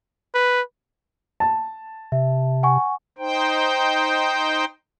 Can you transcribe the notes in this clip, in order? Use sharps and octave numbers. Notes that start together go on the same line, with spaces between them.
B4
A5
C3 E5
F#5 G#5 C#6
D#4 C5 G5